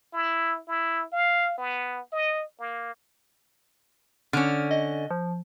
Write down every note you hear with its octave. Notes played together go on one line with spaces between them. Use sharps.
E4
E4
F5
B3
D#5
A#3
D3 C#4 F6
D#5
F3